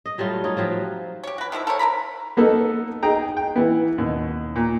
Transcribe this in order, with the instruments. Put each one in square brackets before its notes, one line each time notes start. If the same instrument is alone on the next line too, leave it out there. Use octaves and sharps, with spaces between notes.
[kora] D#5
F#3 G3 A3 F4
D#4 F4 C#5
F3 F#3 C4 B4
[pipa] G4 C#5
F#4 B4
D#3 F3 A#3 E4
A4 A#4 C5 C#5
A#4 C5 A#5 B5
[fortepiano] A#3 B3 D#4 A4
D#4 G#4 G5 A#5
G5
E3 B3
D#2 B2
A#2